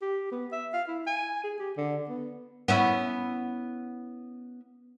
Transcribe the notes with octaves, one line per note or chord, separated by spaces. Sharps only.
G4
B3
E5
F5
E4
G#5
G#4
G4
D3
B3
B3 C#4 E4